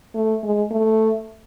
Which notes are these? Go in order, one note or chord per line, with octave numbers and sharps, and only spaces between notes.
A3
G#3
A3